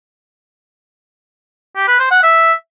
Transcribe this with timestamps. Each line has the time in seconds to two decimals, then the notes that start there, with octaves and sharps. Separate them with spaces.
1.76 G4
1.88 B4
1.99 C5
2.11 F#5
2.23 E5